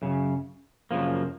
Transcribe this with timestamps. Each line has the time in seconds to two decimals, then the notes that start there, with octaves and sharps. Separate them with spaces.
0.02 F#2 C#3
0.91 F#2 C#3 F3 A#3